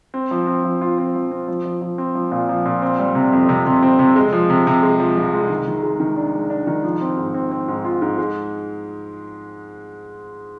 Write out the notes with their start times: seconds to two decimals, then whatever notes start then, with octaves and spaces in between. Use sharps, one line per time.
0.14 C4
0.31 F3
0.47 C4
0.64 F3
0.81 F4
0.98 C4
1.15 F3
1.31 C4
1.48 F3
1.65 F3
1.82 F3
1.98 C4
2.15 F3
2.31 A#2
2.49 F3
2.65 A#2
2.82 C4
2.99 G3
3.15 C3
3.32 F2
3.49 C3
3.66 C3
3.83 C4
3.99 C3
4.16 G#3
4.33 F3
4.50 C3
4.67 C3
4.83 G#3
5.00 F3
5.17 C2
5.33 G#3
5.50 D#3
5.67 D#3
5.83 G#3
6.00 D#3
6.17 D4
6.34 G#3
6.50 D4
6.67 D#3
6.84 F3
7.01 C4
7.17 G#2
7.34 C4
7.51 C4
7.68 G#2
7.85 F4
8.02 G#2
8.18 G#3